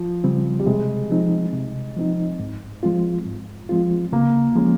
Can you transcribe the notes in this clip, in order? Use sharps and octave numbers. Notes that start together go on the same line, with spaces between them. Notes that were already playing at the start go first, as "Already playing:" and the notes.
Already playing: F3
C#3 G3 C4
G3
C3 G#3
F3 C4 D#4
C3
F3 C4 D#4
G#2
F3 G#3 C4 F4
G#2
F3 G#3 C4 F4
C#3 A#3
F3 G#3 C#4